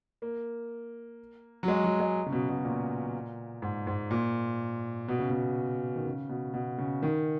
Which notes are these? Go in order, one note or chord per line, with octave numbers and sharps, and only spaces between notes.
A#3
F#3
G#3
F#3
G#3
C#3
B2
B2
A#2
G#2
G#2
A#2
B2
C#3
B2
D#3
C#3
B2
B2
C#3
D#3